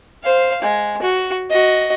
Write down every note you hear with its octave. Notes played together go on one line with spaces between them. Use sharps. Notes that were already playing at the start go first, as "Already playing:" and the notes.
C5 F5
G#3
F#4
F#4 D#5